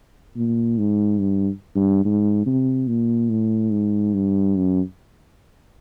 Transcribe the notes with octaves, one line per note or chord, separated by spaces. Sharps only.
A#2
G#2
G2
G2
G#2
C3
A#2
A2
G#2
G2
F#2